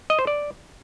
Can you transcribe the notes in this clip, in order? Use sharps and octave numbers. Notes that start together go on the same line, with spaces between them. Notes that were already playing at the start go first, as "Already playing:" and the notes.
D#5
C5
D5